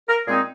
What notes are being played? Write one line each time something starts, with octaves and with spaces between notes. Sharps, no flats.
A#4
A#2 G#3 C4 D#4 G#4